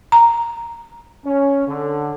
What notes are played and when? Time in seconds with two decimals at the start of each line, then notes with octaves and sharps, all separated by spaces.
0.12 A#5
1.25 C#4
1.68 D3